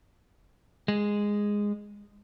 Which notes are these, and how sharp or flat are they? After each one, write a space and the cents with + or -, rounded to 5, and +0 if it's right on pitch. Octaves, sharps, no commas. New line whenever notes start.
G#3 -10